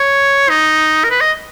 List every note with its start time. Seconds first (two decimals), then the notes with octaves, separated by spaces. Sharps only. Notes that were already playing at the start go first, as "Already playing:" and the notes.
Already playing: C#5
0.49 D#4
1.04 A#4
1.10 B4
1.21 D#5